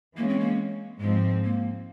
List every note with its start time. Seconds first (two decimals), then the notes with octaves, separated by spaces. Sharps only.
0.17 E3 G#3 A#3 C#4
0.29 C4
0.39 A#3
1.01 G#2 F3 G#3 C4
1.44 A#3